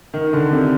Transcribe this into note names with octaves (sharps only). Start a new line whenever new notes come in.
D#3
D3
C3